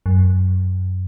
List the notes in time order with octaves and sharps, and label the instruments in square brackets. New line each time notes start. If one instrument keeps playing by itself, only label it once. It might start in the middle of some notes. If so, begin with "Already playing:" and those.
[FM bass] F#2